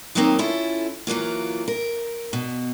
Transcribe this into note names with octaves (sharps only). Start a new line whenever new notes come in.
D#3 F#3 A3 A#3 C4 D#4
C#4 E4 F4 A4
E3 F#3 A#3 F4
A#4
B2